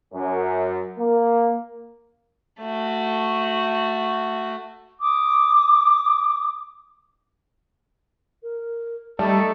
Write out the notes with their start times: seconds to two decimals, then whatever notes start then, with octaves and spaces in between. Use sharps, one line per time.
0.14 F#2
0.99 A#3
2.62 A3 F#4
4.99 D6 D#6
8.43 A#4
9.19 G3 A3 D#4 A4 A5